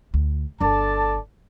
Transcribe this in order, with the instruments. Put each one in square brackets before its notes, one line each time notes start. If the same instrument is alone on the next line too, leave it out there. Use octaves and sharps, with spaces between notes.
[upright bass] D2
[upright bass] G1 D4 [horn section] A4 D5 A5